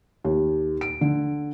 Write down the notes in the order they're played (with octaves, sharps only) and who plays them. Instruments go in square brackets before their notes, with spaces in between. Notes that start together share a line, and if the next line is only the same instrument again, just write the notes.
[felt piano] D#2
D7
D3